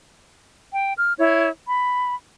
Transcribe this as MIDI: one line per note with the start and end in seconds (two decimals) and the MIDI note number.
0.74 0.94 79
0.96 1.12 89
1.19 1.49 64
1.19 1.49 73
1.68 2.15 83